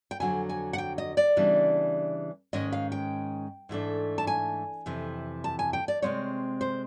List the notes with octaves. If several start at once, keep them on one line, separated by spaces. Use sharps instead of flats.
G5
F2 D3 F#3 G#5
G#5
F#5
G5
D#5
D5
C#3 E3 G3 B3 D4
G#2 D#3 G#3 C#4 D#5
F5
G5
G#2 E3 A3 D4
A5
G#5
F2 C3 E3
A5
G#5
G5
D5
C3 D#3 G#3 C4 C#5
C5